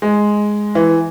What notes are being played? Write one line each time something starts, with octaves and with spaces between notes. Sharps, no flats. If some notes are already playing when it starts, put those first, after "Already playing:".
G#3
E3